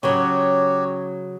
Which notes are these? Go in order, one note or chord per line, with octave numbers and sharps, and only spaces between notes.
C#3 F#3 F#4 G4 C#5